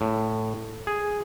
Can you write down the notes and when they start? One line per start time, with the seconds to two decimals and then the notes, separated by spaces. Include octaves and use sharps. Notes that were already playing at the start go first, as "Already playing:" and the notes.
0.01 A2
0.87 G#4